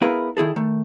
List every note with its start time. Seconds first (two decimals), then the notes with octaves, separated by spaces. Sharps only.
0.02 B3 E4 G#4 A#4 B4 F5
0.37 D#3 E4 G#4 A4
0.56 D#3 A3